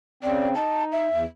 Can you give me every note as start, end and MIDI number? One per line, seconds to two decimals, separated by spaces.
0.23 0.54 49
0.23 0.54 60
0.23 0.48 74
0.55 1.08 63
0.55 0.84 81
0.92 1.21 76
1.11 1.25 40